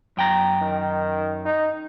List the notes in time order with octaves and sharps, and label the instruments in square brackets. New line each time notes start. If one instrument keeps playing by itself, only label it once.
[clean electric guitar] F#2 G5 A#5
[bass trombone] D#3
D#4